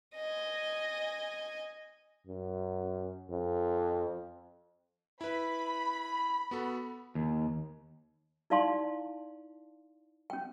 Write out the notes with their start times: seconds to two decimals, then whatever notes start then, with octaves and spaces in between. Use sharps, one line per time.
0.16 D#5 G#5
2.27 F#2
3.30 F2
5.21 E4 B4 B5
6.51 B3 F#4 A4
7.15 D#2
8.50 D#4 E4 D5 F5 A5 C6
10.30 C#4 G5